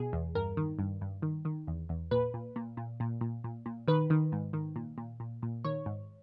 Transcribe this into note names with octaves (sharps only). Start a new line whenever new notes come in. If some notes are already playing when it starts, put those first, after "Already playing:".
Already playing: B2 G#4
E2
G2 A#4
D#3
G2
G2
D#3
D#3
E2
E2
A#2 B4
A#2
A#2
A#2
A#2
A#2
A#2
A#2
D#3 B4
D#3
G#2
D#3
A#2
A#2
A#2
A#2
D#3 C#5
G#2